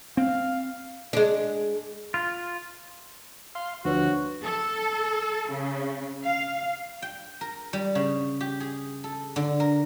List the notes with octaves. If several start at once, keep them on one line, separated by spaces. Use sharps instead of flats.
C4 F5
G#3 D4
F4
F5 C6
D2 F3 D4 F#4 B4 C#5
A4
C#3
F5
G5
A#4
G3
C#3
G4
G#4
A4
D3
A#4